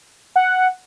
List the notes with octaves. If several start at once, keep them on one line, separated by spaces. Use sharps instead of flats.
F#5